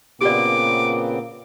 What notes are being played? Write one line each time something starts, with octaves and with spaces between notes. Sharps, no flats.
A#2 C#3 B3 C4 G4 D5 D6